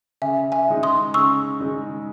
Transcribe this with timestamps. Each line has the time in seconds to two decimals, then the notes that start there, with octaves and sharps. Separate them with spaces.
0.22 C#3 E5 G#5
0.52 E5 G#5
0.68 G#3 D#4
0.83 C6 D#6
1.14 C#3 C#6 E6
1.60 G#3 D#4